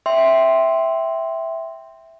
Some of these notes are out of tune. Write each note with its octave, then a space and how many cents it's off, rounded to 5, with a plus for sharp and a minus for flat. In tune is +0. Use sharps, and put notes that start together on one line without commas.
E5 +0 G5 +0 C6 +0